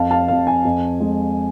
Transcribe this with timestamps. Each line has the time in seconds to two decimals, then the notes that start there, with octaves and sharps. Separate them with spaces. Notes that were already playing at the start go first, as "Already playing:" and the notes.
Already playing: F2 F5 A5
0.11 F5 A5
0.28 F2 F5
0.47 G#5
0.65 F2
1.00 G#3